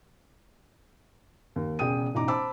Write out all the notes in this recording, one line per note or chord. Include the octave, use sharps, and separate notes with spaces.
D#2
E1 C#3 G#4 G5 D#6 D#7
E1 A1 D#4 A#5 D6
C5 A5 B5 D6 E6